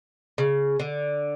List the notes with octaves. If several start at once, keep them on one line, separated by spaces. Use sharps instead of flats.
C#3
D3